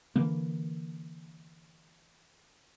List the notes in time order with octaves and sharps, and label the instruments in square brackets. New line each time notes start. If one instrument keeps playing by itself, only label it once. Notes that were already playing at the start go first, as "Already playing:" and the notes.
[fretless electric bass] D3 E3 A#3